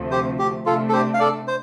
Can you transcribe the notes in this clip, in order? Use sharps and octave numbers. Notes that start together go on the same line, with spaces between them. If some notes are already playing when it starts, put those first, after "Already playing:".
Already playing: D2 C3 F3 A3
G4 C5
G4
C3 A3 D4 F4 A4
A4
G4 C5
F5
A4 D5
C5